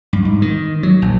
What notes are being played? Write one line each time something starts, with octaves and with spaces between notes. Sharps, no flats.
G2
G#2
D#3
F#3
A#1